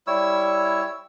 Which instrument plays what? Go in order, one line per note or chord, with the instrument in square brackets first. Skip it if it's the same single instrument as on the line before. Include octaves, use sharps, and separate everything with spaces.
[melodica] G3 E4 C#5 E6